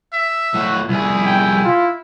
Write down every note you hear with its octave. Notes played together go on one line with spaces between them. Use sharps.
E5
A2 F#4
C2 E4 G#4
G5
F4